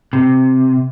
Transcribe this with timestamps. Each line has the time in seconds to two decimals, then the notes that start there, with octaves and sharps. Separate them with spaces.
0.13 C3